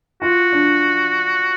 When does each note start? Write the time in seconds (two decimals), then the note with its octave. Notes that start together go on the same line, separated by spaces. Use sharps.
0.22 F4 F#4
0.52 D4